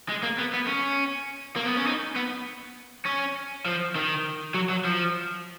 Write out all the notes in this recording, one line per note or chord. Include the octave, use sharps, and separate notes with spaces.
G#3
A#3
B3
B3
C#4
A#3
B3
C#4
D#4
B3
C#4
F3
D#3
F#3
F#3
F3